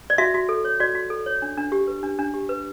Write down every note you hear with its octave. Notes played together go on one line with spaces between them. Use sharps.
D5
F#4 E5
F#4
A4
C#5
F#4 D5
F#4
A4
C#5
D4
D4
G4
B4
D4
D4
G4
B4